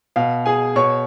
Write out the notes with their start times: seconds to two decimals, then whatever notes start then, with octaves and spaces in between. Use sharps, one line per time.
0.16 B2 F5
0.46 G#4 G#5
0.76 B2 C#5 C#6